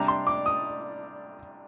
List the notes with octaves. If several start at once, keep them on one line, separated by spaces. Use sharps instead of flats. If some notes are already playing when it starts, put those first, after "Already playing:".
Already playing: C3 G3 D4 A#5
C6
D6
D#6